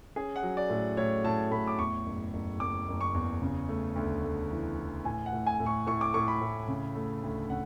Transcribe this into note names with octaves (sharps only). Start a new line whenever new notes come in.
C#4 G#4
F#5
F#3
D5
A2
A2 C#5
A2 A5
A2 B5
D6
E2 C#6
F#1
F#1
F#1 D6
F#1
C#6
E2
C#3
A3
D2
A3
E3
E3
A2 G#5
F#5
A2
G#5
A2
C#6
A2 C#6
D6
A2 C#6
B5
A2
C#3
A3
D2
C#3 F#5